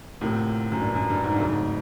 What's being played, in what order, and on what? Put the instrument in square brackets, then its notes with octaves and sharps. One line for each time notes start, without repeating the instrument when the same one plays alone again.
[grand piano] D2 C3 F3 A#3 [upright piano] A2
[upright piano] F#2
G2
F#2
G2
G#2
G2
[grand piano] F2 C#3 F#3 A3 [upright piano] G#2